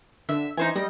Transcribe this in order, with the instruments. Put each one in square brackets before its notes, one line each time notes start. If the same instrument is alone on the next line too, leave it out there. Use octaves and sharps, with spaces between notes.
[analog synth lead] D3 [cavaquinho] E5
[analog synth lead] E3 [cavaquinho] D#4 C5 G#5
[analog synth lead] G3 [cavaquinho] D#5